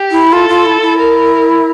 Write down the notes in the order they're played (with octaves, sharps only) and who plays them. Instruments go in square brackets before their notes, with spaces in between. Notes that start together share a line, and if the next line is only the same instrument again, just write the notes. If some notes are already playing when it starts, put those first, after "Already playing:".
Already playing: [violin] G4
[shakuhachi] E4
[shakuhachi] F4 [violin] A4
[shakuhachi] F4
E4
E4
[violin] A#4